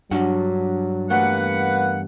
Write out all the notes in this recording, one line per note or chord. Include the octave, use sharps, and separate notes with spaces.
G2 F#3 D4 F#4 F#5
E2 G3 A3 A#3 B4 F#5